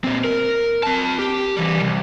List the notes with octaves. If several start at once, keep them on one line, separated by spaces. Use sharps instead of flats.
A#2 C4
A#4
C4 A5
G4
E3 G3
C2